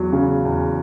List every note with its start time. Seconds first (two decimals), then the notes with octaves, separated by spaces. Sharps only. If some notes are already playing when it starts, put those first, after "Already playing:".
Already playing: E2 F#3
0.13 C#3
0.45 E2